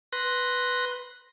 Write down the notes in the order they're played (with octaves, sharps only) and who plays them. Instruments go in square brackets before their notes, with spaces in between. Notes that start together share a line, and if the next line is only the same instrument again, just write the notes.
[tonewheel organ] B4 C6 F#6 A#6